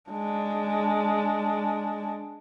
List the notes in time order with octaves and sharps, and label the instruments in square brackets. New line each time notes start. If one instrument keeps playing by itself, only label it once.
[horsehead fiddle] G#3 D4